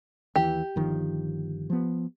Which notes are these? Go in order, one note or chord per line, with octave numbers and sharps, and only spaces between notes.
D#2 E3 G4
G1 D#3 F3
F3 B3